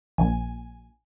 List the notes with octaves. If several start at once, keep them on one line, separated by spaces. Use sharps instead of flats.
A#1 G#5